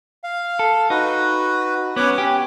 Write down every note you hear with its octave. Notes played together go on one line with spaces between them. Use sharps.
F5
A4
D#4 F#4 B4
B3 C#4 B4 C#5 D6
C#4 G4